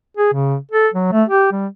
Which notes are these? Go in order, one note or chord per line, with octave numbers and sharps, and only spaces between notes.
G#4
C#3
A4
F#3
A3
G4
G3